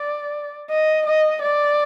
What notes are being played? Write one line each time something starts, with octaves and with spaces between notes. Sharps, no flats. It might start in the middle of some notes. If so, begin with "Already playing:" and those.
Already playing: D5
D#5
D#5
D5